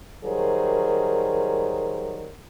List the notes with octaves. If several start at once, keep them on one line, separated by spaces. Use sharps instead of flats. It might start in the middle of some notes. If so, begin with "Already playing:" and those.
D#3 F#3 G3 G#4 A#4 C5